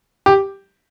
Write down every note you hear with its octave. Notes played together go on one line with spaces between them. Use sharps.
G4